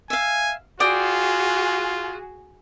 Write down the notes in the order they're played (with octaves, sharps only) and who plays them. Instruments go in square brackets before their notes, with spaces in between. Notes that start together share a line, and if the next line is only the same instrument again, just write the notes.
[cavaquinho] E5 F5 [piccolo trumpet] G#5
[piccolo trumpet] F4 [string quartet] F#4 G#4 [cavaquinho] D5 G5 D#6